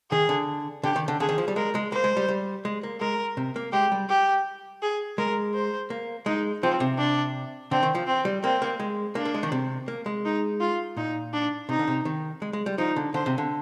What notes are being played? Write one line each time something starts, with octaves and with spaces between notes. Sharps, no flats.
D#3 G#4
D3
D3 G4
D#3
D3
D3 G#4
D#3
F3
G3
G#3 A#4
G#3
A#3 C5
G#3
G3
G3
G#3
A#3
G#3 A#4
C3
A#3
G#3 G4
G3
G4
G#4
G#3 A#4
C5
A#3
G#3 D#4
F3 C4
C3
D4
D3 C4
D#3
F3
C4
G3
A#3 C4
A#3
G#3
A#3 D4
A#3
G#3
D#3
C3
A#3
G#3
D#4
F4
A#2 D#4
D4
C3 D#4
D3
C3
D#3
G#3
G#3
G3
F3 D#4
D3
D3 C5
C3
D3